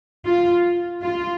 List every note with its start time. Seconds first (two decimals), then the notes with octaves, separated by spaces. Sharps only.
0.27 F4
1.03 F4